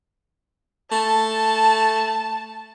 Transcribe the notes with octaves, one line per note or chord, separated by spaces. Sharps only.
A3 A5